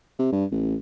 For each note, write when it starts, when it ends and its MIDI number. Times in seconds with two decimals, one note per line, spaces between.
0.19 0.31 48
0.32 0.45 43
0.52 0.76 33